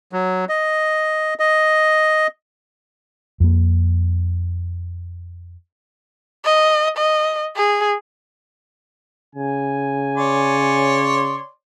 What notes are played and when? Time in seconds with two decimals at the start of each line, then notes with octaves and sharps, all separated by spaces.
0.13 F#3
0.49 D#5
1.39 D#5
3.40 F2 A#3
6.45 D#5
6.97 D#5
7.56 G#4
9.35 C#3 G#5
10.17 C#5 D5 C6